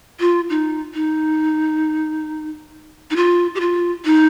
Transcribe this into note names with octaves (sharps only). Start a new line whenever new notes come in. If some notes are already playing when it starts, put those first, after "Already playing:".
F4
D#4
D#4
D#4
F4
G4
F4
D#4